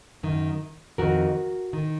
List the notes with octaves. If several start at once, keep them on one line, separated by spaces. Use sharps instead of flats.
F#2 D#3
F2 D#3 F#4 A#4
D#3